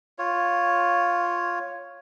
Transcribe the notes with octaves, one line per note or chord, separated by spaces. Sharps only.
F4 C#5